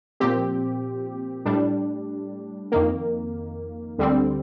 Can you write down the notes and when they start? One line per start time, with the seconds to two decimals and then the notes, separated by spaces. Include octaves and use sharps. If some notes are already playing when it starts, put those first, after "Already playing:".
0.20 A#2 F3 C4 G4
1.45 A2 G3 D4
2.72 F2 D#3 A#3
3.98 D2 D3 G3 C4